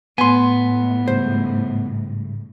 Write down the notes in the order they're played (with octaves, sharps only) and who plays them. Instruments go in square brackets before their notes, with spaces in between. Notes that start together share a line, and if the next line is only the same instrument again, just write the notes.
[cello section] A2 [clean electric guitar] B3 [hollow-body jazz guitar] G#5 C6
[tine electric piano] G#2 C#3 G3 [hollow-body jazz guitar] C5